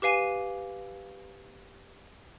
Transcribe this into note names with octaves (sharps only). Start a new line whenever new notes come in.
G4 B4 F5 G#5 D#7